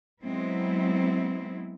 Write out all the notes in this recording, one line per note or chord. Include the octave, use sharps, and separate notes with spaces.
F#3 G#3 B3 C4 E4